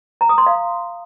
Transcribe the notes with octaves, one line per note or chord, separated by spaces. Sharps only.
A#5
D#6
C6
F5